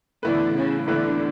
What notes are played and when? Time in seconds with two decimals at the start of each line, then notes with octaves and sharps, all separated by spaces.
0.23 A2 D3 E3 B3 E4 B4
0.56 C#3
0.87 A2 D3 E3 B3 E4 B4